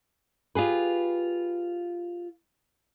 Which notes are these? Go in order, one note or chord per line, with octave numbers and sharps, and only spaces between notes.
F4 G4 G#4 B4